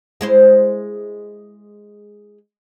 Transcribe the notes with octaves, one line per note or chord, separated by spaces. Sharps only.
G#3 E4 C5